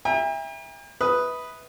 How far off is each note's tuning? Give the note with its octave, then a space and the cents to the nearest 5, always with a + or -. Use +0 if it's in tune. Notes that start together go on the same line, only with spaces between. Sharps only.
E5 +0 G5 +45 A#5 +30
B4 +0 E5 -25 D#6 +0